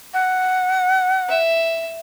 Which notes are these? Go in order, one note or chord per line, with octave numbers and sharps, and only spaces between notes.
F#5
E5